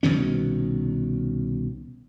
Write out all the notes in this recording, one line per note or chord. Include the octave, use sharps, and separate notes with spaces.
C2 B2 D#3 C#4